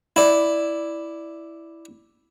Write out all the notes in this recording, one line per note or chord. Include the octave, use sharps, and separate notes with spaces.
E4 D5